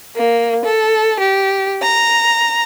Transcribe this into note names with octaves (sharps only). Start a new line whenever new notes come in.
A#3
A4
G4
A#5